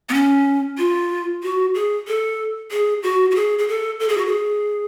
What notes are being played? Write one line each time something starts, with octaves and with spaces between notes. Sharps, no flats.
B3
C#4
F4
F#4
G#4
A4
G#4
F#4
F#4
G#4
G#4
A4
A4
G#4
F#4
G#4